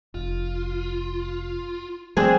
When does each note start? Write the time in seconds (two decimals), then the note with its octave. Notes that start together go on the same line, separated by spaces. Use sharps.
0.15 F1 F4
2.17 F3 G3 A3 C4 D4 G#4